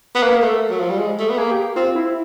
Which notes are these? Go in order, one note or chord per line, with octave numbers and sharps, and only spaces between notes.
B3
A#3 B4
A#4
A3
A4
F#3
F3
G3
G#3
A3
B3
A#3 G#4
G4
C4 F4
E4